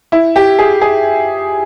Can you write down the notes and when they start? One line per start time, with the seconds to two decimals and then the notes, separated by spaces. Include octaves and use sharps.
0.12 E4
0.36 G4
0.59 G#4
0.81 G#4